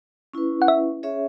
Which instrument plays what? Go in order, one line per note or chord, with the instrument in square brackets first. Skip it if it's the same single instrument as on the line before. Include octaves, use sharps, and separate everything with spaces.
[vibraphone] C#4 E4 B4
[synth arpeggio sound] F#5
E5
[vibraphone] C#4 G#4 C#5 E5